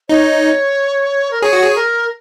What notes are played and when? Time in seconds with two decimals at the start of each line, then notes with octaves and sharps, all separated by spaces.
0.09 D#4 C#5
1.31 A#4
1.42 G#4 C#5
1.53 F#4
1.63 G#4
1.76 A#4